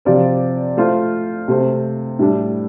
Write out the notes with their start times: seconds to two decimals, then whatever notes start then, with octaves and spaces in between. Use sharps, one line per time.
0.05 C3 F3 C4 G4 D5
0.77 A3 F4 C5
1.48 C3 A3 C4
2.19 A2 G3 D4